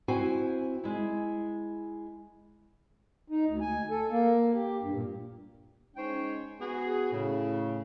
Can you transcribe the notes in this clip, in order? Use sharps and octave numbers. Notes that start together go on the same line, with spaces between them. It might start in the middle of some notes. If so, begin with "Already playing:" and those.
C4 E4 F#4 C5 G#5
G#3 E4
D#4
D2
G#5
A4
A#3
G4
G2
A#2
G#3 C#4 D#4 C5 C#5 G5
B3 F#4 G#4
A2 C#3